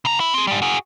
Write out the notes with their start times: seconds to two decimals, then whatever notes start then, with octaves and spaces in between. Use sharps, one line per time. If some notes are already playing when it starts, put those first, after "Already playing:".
0.05 C#3 A#5
0.20 E4
0.34 C4 G#4
0.47 G#2 G3
0.62 F#4 G#4